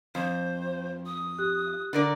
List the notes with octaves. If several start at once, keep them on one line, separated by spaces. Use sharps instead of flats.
F2 C5
D#6
G4 F#6
D3 A#4 D5